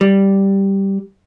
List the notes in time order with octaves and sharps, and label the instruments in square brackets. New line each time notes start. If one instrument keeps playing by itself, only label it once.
[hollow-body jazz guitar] G3